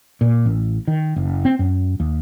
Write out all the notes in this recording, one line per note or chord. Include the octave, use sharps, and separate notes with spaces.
A#2
A1
D#3
F#1
C4
F#2
D#2